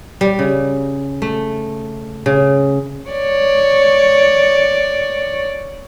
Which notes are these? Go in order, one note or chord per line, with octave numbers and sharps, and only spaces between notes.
G3
C#3
A3
C#3
C#5 D5